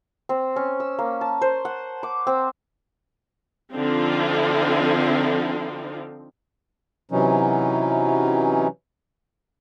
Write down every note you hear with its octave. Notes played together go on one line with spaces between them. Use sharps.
C4
C#4
E6
A#3
A5
C5
F#5
D6
C4
D3 F3 C4 D#4 F4
C3 E3 F#3 C#4 D#4